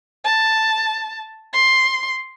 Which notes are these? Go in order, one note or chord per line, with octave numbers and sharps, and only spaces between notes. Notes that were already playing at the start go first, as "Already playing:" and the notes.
A5
C6